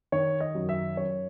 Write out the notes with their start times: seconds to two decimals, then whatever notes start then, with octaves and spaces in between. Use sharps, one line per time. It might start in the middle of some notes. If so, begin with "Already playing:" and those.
0.12 D#3 C#5
0.40 D#5
0.55 F#2
0.69 E5
0.97 F#2 C#5